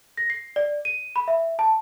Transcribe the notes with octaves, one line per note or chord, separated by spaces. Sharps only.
A#6
C7
D5
D#7
B5
E5
A5